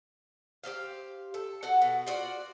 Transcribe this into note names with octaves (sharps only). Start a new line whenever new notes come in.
G4 A4 C5 F5
A4
F#4 A4 F#5
B2
F4 F#4 D5